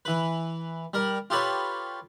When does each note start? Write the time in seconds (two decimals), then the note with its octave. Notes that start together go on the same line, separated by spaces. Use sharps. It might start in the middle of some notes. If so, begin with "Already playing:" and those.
0.05 E3 B4
0.94 G3 A#4
1.30 F4 G4 A4 B4 C#5